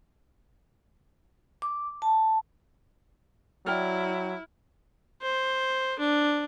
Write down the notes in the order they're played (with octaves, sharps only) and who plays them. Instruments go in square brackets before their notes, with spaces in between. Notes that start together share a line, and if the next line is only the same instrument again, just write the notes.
[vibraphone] D6
A5
[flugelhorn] F#3 [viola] E4 [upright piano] D5 G5 F6
[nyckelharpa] C5
D4